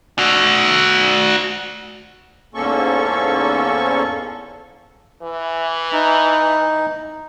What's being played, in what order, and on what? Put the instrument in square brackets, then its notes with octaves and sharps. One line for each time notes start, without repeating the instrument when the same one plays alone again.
[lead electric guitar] F#4 D5
[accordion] E2 G#2 A#3 C#4 A4 C#6
[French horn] E3
[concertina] D#4